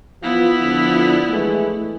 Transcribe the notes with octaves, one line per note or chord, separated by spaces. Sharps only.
E3 F3 B3 E4 F4
D3 F3
E3 G#3 A3